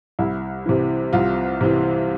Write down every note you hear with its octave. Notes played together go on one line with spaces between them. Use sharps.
C2 E4
C3 E3
C2 F4
C3 E3